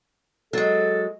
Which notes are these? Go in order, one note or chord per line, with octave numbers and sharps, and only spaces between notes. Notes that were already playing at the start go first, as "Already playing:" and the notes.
F#3 G#3 A4